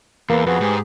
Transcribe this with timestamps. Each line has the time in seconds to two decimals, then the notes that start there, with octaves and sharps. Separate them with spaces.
0.30 E2 A#3 B4
0.47 F2 B3 F#4 G#4 B4
0.61 G#2 G4 G#4